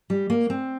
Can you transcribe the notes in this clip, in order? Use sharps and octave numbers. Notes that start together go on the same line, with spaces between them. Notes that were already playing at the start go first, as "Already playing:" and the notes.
G3
A#3
C4